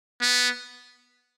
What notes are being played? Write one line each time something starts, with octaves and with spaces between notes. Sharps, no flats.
B3